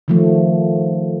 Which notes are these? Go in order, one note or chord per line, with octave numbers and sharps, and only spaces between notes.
D#3 F3 A3